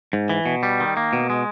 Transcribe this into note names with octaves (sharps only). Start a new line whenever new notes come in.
G#2
E3
B2
G3
D#3
A#3
B2
G#3